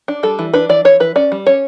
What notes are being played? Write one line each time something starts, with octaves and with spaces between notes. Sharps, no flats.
D4
G3 A4
E3
D4 B4
E3 D5
E3 C#5
E3 B4
C#4 D5
G3
C#4 C#5